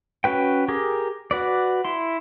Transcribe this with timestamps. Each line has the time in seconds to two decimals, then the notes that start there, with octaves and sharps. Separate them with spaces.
0.24 C#4 F#4 B4 G5
0.68 G4 G#4 A#4
1.31 F#4 B4 D5
1.85 E4 C6